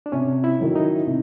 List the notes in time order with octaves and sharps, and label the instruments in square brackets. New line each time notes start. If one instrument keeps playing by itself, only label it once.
[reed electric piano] D4
[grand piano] C3 [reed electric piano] C#4
[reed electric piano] E4
[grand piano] D#3 F#3
[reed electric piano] D#4
[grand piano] C3